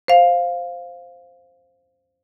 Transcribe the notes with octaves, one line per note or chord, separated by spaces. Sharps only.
C5 F5